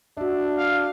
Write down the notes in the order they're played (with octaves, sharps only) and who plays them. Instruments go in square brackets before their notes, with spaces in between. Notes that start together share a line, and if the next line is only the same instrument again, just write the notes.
[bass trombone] D4 [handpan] F#4 E5
[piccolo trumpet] F5